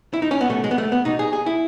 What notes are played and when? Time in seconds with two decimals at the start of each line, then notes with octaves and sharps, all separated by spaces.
0.14 E4
0.22 D#4
0.31 C#4
0.41 B3
0.50 B2 A3
0.64 G#3
0.71 B3
0.78 A3
0.92 B3
1.05 B2 D#4
1.19 G#4
1.33 G#4
1.46 E4